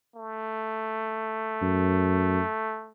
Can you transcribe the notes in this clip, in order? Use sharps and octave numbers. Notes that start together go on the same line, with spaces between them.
A3
F#2